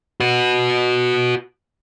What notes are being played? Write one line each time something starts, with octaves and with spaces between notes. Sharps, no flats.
F#4 B4